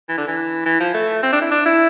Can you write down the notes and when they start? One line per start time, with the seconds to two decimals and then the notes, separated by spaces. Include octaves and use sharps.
0.09 E3
0.18 D3
0.27 E3
0.65 E3
0.80 F3
0.94 A3
1.22 C4
1.32 D4
1.41 E4
1.51 D4
1.65 E4